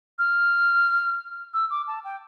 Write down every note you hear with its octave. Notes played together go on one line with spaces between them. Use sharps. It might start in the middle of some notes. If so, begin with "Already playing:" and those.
F6
E6
D6
A5
G5